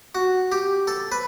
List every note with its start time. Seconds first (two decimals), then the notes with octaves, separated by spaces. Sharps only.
0.15 F#4
0.52 G4
0.87 A4
1.12 B4